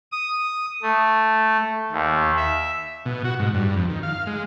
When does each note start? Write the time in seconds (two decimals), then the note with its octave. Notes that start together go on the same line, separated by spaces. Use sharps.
0.12 D#6
0.82 A3
1.92 D#2
2.37 E5
3.06 B2
3.25 F#4
3.40 G#2
3.54 G2
3.76 F2
3.89 D#3
4.03 F5
4.27 G#3